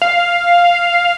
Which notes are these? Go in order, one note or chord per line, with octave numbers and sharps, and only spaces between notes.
F5